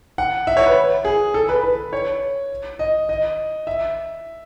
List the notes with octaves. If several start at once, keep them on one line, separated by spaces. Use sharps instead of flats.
F#5
E5
C#5
B4
G#4
A4
B4
B4
C#5
D#5
D#5
E5